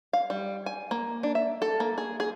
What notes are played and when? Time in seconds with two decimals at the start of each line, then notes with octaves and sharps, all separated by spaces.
0.13 F5
0.30 G3
0.66 G#5
0.91 A#3
1.23 D4
1.35 E5
1.62 A4
1.80 A#3
1.98 G#4
2.20 G#4